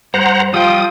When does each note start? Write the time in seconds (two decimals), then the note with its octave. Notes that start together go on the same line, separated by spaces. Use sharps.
0.14 G2 C5 F#5 A#5
0.54 F3 G3 G5 D#6